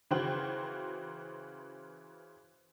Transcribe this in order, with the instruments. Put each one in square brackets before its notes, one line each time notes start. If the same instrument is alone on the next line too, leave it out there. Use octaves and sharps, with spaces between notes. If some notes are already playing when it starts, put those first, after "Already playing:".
[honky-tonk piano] C#3 E3 F#4 C5 G5 F#7